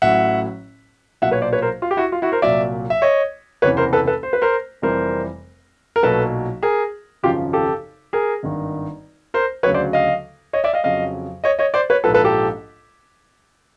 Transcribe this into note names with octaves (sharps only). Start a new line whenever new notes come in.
A1 A2 F#3 E5 F#5
B1 A#2 F#3 E5 F#5
B4 C#5
C5 D5
B4 C#5
A#4 C5
F4
G4
E4 F#4
F4
E4 F#4
A#4 C5
C2 A#2 F#3 D5 E5
E5
C#5 D#5
F#1 E2 C3 E3 B4 C#5
A#4 C5
A4 B4
A4 B4
C5
B4
A#4 C5
F1 F2 C3 E3 G3 A#4 C5
A#4
B1 A#2 F#3 A4 B4
G#4 A#4
G#1 F#2 C#3 F3 F4 G4
G4 A4
G#4 A#4
G#1 G2 D#3
A#4 C5
D2 C#3 F#3 B4 C#5
C5 D5
D#5 F5
C#5 D#5
D5 E5
D#5 F5
F2 C#3 F#3 D#5 F5
C#5 D#5
C#5 D#5
C5 D5
B4 C#5
A#1 G#2 F3 A4 B4
A4 B4
G4 A4